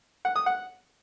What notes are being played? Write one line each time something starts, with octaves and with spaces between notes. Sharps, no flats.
F#5
D#6
F#5